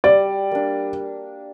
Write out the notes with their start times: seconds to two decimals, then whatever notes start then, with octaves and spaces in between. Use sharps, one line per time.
0.04 G3 D5
0.51 A#3 D4